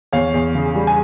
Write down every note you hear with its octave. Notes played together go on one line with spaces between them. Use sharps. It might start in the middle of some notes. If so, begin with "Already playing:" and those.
E2 C#5 F5
E2
C#3
G3
G#5